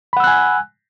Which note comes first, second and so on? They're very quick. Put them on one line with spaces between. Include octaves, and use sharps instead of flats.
B5 F#5 E6 F#6 G#5